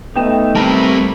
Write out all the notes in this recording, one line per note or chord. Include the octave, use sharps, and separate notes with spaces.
A3 B3 D#4 G5 E7
G3 C4 A#4 B4 E5 A5